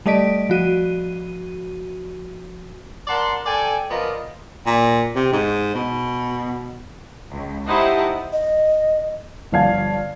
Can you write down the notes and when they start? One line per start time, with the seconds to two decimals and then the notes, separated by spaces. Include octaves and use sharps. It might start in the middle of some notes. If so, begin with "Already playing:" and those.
0.06 G3 A3 D5 D#5 B6 D7
0.49 F3 F#4 D#7
3.08 A#4 D5 F#5 A5 C6
3.45 A4 D5 G5 G#5
3.89 F3 B3 F4 A#4 D5 D#5
4.66 A#2
5.15 C3
5.33 G#2
5.75 B2
7.31 C#2
7.66 D#4 E4 G4 C5 F#5 A5
8.33 D#5
9.52 G1 F3 D5 F5 A5 G#6